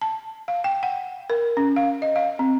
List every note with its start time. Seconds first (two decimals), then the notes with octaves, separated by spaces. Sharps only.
0.01 A5
0.48 F5
0.64 G5
0.83 F#5
1.30 A#4
1.57 C#4
1.76 F5
2.02 D#5
2.16 F5
2.39 C4